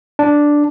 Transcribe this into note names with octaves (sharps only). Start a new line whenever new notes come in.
D4